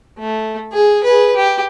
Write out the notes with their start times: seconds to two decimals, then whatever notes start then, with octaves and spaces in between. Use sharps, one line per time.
0.19 A3
0.73 G#4
1.04 G#4 B4
1.36 G4